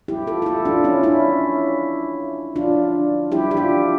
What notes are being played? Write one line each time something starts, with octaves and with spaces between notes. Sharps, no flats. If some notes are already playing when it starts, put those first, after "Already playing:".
E4 G4
F4 A4
A4
E4 G4
D4 F4
C#4 E4
C#4 E4
D4 F4
E4 G4
G4
D4 F4